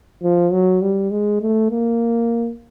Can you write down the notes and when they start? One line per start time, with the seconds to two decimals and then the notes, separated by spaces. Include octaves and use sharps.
0.23 F3
0.52 F#3
0.82 G3
1.11 G#3
1.41 A3
1.71 A#3